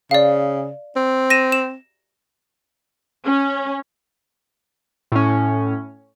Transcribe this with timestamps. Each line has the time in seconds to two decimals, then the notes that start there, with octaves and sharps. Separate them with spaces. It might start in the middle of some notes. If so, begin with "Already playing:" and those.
0.11 C#3 D5 F5
0.96 C4
1.30 A#6 D#7 E7
1.52 E7
3.25 C#4
5.12 A2 C#4